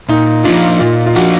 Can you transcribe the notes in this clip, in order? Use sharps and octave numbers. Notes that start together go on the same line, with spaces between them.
A#2 D#4
F3 A#3 D4 F4
A#2 F4
F4
F3 A#3 D4 F#4